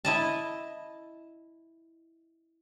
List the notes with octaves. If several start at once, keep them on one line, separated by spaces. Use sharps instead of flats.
E4 D#5 A5